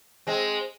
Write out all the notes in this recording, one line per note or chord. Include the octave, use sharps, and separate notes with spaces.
G#3 C4